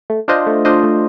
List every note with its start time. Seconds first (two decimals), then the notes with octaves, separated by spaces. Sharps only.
0.10 A3
0.28 D4 F4 C5 D#5
0.47 A3
0.65 D4 F4 C5 D#5
0.83 A3